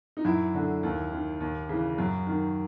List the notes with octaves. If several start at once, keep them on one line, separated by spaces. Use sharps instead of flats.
D#4
F#2 E4
D3
D#2
D#3
D#2
C#3 E3
F#2
D#3